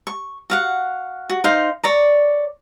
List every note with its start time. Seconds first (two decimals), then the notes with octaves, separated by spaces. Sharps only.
0.07 C#6
0.50 F#4 F5 F#5
1.30 F#4
1.44 D#4 C5 F5 C6
1.84 C#5 D5 A#5